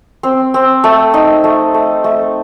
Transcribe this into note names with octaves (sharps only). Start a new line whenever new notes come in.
C4
C4
A3
D#4
A3
A3
A3